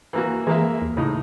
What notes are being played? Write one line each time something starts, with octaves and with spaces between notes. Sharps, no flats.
E3 A#3 F#4
E3 G#3 A#3 E5
D#2
A2 C#3 D#4